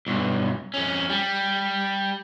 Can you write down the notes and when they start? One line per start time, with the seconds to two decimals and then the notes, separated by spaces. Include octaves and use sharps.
0.07 B1 G2
0.74 F2 C#4
1.09 G3